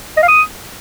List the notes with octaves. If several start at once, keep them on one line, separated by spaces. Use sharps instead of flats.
D#5
F5
D#6